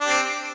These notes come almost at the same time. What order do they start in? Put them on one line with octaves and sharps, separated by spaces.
D4 G4 C4